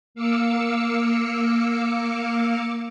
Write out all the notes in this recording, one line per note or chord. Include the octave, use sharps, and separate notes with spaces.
A#3 F5 D6 E6 C#7